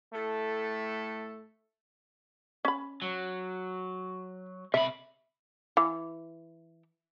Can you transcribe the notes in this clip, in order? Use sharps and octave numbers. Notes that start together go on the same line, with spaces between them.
A2 A3 A4
C#4 B5
F#3
C3 E5 B5
E3